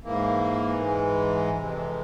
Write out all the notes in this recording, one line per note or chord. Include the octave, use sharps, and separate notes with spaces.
G#2 E3 A#3
G#3
F2 C3 E3